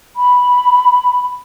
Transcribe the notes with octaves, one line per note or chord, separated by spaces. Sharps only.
B5